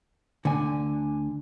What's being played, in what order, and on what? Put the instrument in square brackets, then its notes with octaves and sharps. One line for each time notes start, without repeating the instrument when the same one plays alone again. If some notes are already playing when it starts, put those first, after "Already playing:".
[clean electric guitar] D2 G#5 [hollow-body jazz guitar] D3